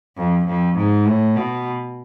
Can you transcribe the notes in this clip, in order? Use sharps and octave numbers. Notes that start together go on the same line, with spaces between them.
F2
F2
G#2
A2
B2